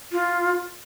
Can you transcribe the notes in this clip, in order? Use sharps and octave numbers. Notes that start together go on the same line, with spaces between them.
F4